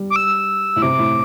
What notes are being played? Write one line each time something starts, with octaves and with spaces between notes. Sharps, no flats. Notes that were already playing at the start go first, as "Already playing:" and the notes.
Already playing: G3
D6
E6
A2
C3 D6
A2